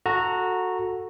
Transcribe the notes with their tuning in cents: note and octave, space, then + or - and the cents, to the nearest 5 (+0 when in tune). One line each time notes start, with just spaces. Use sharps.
F#4 -10 A4 +10 A#5 +0